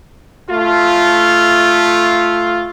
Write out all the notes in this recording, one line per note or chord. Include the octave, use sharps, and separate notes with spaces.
A3 F4